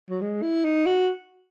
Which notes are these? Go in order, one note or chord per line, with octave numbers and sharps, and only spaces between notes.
F#3
G#3
E4
D#4
F#4